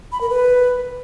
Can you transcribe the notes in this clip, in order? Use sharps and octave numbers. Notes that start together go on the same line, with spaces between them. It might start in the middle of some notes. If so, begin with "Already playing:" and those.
B5
A#4
B4